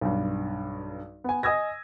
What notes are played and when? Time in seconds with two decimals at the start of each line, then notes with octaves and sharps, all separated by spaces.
0.01 B1 G2
1.24 B3 G#5
1.43 D#5 G#5 D#6 E6 G#6 A#6